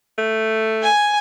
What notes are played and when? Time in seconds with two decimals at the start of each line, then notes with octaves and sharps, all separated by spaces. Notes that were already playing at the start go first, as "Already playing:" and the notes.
0.18 A3
0.83 G#5